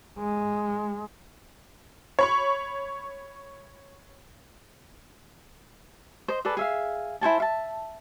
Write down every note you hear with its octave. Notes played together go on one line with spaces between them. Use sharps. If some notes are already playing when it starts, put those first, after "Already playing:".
G#3
C#5 B5 C#6
C5 D#5
G#4 A4 B4 D5
G#4 E5 F5
E4 C5 G#5 A5
E5 F5 A5